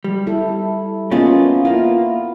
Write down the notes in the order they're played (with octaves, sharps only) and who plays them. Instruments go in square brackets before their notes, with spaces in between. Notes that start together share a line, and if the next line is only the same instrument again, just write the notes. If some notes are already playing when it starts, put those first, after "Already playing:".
[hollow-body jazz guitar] G3
[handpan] E4 A4
[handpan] A#3 B3 D#5 [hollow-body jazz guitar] C#4 F4 G#4
[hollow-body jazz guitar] A#3 F4 [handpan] E4